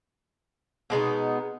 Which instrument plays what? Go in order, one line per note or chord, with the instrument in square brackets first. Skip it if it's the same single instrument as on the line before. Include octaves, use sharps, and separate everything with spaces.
[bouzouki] B2 G#3 B3 D#4